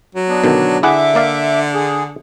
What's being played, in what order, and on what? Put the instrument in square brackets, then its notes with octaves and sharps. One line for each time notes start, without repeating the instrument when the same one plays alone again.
[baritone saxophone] F#3
[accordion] B3 D4
[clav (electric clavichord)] B2 D3 D#3
[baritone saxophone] D3 [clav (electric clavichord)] E4 G#4 F#5 [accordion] E5 D6
[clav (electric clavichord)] A#3 D5 F5
[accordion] G#4